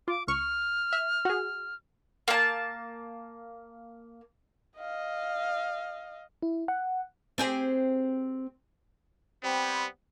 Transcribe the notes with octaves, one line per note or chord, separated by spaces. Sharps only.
F4 D6
C#2 C#6 F6
E5
F#4 G#4
A#3 A5
D#5 F5
E4
F#5
C4 G4 G#4
G3 B3 C4